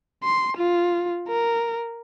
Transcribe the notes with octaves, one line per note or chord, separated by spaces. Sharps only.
C6
F4
A#4